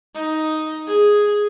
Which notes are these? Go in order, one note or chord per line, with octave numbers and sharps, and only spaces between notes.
D#4
G#4